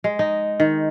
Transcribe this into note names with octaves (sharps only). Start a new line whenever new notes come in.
G#3
D#4
D#3